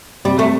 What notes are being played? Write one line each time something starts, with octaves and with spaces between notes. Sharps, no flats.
C3 G3
A3